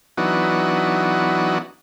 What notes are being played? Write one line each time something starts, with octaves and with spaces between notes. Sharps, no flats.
E3 F#3 B3 D4 D#4 F#4